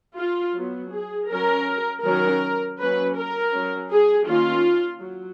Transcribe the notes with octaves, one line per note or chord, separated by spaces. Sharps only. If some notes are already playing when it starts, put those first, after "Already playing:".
F4
F#3 B3
G#4
F#3 C#4 A#4
D#3 F#3 C#4 A#4
F#3 A#3 C#4 B4
A#4
F#3 C#4
G#4
D#3 A#3 C#4 F4
F#3